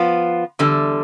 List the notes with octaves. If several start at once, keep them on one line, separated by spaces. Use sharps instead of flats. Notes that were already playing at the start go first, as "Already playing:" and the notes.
Already playing: F3 B3 F4
E2 D3 G3